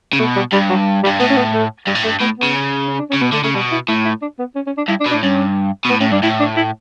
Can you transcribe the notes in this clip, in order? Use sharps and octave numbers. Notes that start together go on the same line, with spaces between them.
C#3
B2 A3
G3
G2 G3
F#3
G3
G2
A2 B3
C#4
B3
A3
G2 G3
A2
G2 A3
A2 B3
B3
C#3
C#4
D4
C#4
C#3
B2 B3
D3 A3
C#3 A3
B2 G3
E4
A2 E4
E4
D4
B3
C#4
C#4
D4
G2 E4
D4
B2
D4
A2
G2 C#4
B2
A2 B3
A2 C#4
G2 D4
A2 E4
D4
E4